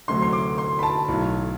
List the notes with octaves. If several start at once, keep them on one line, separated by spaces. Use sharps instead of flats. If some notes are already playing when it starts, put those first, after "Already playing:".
D2 C3 F#3 A3 C6
C6
D6
C6
B5
A5
B1 A2 F#3